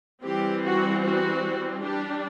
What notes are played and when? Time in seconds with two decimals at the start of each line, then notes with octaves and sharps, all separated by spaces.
0.24 E3 G3 C4 G4
0.63 F#4
1.03 F#4
1.83 G3 D4 G4